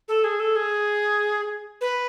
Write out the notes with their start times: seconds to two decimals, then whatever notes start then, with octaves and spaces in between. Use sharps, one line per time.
0.08 A4
0.24 G#4
0.40 A4
0.56 G#4
1.81 B4